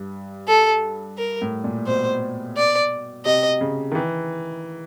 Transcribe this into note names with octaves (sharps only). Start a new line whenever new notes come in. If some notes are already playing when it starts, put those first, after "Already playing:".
Already playing: G2
A4
A#4
A2
A#2
B2 C5
D5
C3 D#5
C#3
D#3
E3